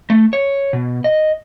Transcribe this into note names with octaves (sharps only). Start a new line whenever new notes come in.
A3
C#5
B2
D#5